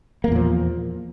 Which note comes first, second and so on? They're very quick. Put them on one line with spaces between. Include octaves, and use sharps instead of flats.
A#3 E2 A#2 F3